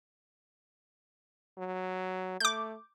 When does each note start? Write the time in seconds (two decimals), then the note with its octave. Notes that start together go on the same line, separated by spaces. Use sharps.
1.58 F#3
2.40 A3 D6 G6